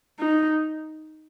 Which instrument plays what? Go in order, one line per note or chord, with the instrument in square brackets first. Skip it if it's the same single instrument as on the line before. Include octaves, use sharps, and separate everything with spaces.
[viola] D#4